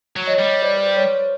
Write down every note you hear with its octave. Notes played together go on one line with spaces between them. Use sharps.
F#3
C#5 D#5
G3
C5 D5
B4
C5
B4 C#5